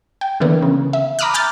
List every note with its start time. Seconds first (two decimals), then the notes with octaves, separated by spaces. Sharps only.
0.21 G5
0.40 D3 E3 A#3 B3
0.62 C#3
0.93 E5
1.19 A#5 B5 D6 D#6 F6 F#6
1.34 G#5 D6 F6 G6 A6